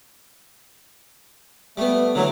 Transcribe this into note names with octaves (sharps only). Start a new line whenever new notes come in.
G3 A3 B3
D3 E3 F#3 A3